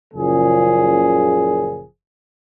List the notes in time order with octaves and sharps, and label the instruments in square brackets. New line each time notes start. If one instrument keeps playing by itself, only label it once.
[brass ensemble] F#1 A#2 C#3 F3 G#4